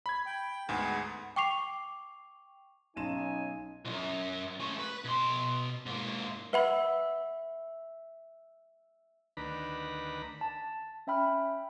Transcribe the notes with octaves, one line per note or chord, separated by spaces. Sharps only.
B5 G#6
G5
D2 G#2 B3 G#4
G5 C#6 D6 C7 F7
B1 C#4 D#4 G#5 C6 E7
C2 F#2
A3 C#4
B4
B2 C6
G#2 A#3
B4 E5 F#5 B5
D2 D#3 D4 B4 A#5 B5
A5
C#4 E5 G5 B5 F6